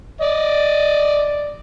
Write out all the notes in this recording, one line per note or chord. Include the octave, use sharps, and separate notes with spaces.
D5 D#5